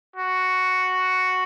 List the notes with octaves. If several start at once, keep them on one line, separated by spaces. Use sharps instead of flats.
F#4